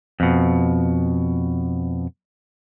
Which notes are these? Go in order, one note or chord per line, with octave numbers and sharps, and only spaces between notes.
F2 B2